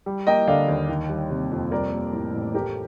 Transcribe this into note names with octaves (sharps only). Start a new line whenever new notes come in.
G3
A#3 D#5 G5
D3 D5 F5
D#2
D#3
G3
C3
F2
G3 A#4 D5
A#3
A2
A1
A3 G4 A#4